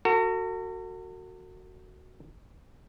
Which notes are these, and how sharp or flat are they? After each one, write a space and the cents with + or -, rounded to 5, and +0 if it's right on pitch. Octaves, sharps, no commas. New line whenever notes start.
F#4 +0 A4 +45